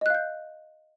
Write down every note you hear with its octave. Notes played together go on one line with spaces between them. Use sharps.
D#5 F5 F#6 G6